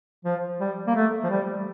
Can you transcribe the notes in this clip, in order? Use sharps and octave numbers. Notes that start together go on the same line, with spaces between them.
F3
G3
A#3
A3
F3
G3